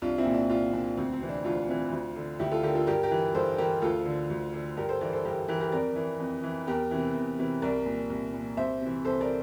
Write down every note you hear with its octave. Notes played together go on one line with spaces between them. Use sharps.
C2 D4 F4
C4 E4
A#2
D4
C2 D4 F4
A#2 D4
D2 C4
C4
C3 E3
D4
D2 D4 F4
C3 E3
D2
D3
D2 E4 G4
F4 A4
D3 G4 A#4
F4 A4
G2 G4 A#4
G4 A#4
E3
G2 A4 C5
E3 G4 A#4
D2 F4 A4
D3
D2
D3
G2 G4 A#4
A4 C5
E3 A#4 D5
A4 C5
G2 G4 A#4
E3 G4 A#4
G4 A#4
F2 A#4 D5
E3
F2
E3
E2 G4 A#4
C3 E3
E2
C3 E3
C2 A#4 D5
A#2
C2
A#2
C2 C5 E5
C3 E3
C2 A4 C5
A#4 D5